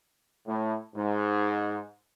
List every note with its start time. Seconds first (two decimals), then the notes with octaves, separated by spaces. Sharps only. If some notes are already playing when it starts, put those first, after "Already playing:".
0.46 A2
0.94 G#2